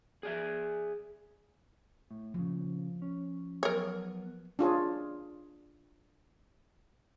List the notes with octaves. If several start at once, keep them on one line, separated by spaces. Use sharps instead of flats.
G#4 D5 E5
A2
A#2 C#3 F3
C#4
F#3 B3 A#4 C#5
D4 F4 G#4 C#5